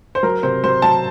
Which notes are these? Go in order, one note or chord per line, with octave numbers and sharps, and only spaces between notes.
C5
F#3 A#4
C3 C5
F#3 C5
F#3 A5